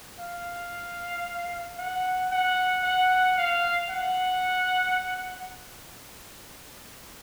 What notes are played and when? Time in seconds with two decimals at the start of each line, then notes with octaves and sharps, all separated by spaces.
0.20 F5
1.78 F#5
2.31 F#5
2.84 F#5
3.37 F5
3.90 F#5